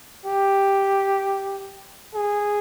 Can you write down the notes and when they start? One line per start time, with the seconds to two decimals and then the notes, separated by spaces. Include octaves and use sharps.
0.26 G4
2.15 G#4